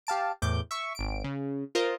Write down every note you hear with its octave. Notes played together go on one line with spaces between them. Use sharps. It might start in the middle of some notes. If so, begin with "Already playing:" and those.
G4 F5 A5 D7
E2 A2 D6 G6
E5 C#6
G#1 D7
C#3
F4 A#4 C5 D#5